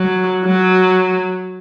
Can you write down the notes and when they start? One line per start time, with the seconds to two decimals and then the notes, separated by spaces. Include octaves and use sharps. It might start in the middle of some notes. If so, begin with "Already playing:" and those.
Already playing: F#3
0.44 F#3